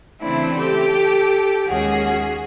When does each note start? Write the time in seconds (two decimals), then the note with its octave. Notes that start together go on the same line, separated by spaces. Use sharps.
0.21 C#3 E3 A3 C4 D4 E4
0.57 G4 A4
1.67 D#2 D#3 G#3 C#4 F#4 G#4